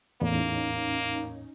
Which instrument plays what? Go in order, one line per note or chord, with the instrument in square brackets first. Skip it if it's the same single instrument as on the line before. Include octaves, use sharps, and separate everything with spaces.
[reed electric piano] E2 A2 [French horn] A#3 [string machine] C#4 D#4